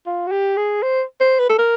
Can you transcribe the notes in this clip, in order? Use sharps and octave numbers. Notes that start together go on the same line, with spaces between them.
F4
F#4
G4
G#4
C5
C5
B4
A4
A#4